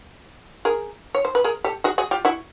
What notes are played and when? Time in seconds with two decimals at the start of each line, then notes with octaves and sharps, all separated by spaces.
0.65 G#4 A#4
1.15 C#5
1.25 C5
1.35 B4
1.44 G#4 A#4
1.64 G4 A4
1.84 F#4 G#4
1.98 F#4 G#4
2.11 F4 G4
2.25 E4 F#4